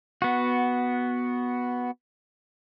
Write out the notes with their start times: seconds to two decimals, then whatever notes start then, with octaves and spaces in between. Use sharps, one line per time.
0.22 B3 F#4